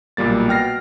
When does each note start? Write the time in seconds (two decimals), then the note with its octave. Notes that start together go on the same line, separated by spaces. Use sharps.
0.17 B1 A#2 G3 A#3 A6
0.48 B2 G5 F6 A#6 C7